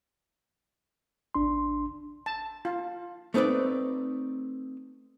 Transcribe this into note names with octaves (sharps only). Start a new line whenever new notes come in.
G#1 D4 C6
A5
F4
A3 C4 D#4 B4 D5